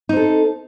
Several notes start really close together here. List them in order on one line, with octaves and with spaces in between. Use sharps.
D#4 C4 A4